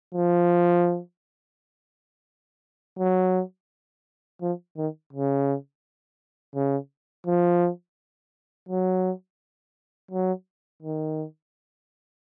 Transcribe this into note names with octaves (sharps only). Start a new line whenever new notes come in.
F3
F#3
F3
D#3
C#3
C#3
F3
F#3
F#3
D#3